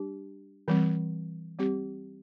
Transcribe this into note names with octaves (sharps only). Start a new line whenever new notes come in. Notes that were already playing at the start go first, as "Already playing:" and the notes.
Already playing: G3 D4 G4
E3 G3 C4
G3 C4 G4